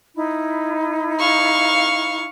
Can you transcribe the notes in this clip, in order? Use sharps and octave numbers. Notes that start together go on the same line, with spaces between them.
D#4 E4 B5
F5 C#6